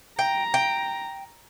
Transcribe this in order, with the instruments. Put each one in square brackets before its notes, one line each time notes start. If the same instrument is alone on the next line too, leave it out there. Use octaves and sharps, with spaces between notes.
[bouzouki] G5 [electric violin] A#5
[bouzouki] G5